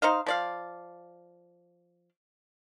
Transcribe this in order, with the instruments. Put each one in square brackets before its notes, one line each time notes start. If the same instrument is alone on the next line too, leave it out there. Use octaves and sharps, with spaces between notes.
[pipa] D#4 C5 D#5 F5
F3 D5 F5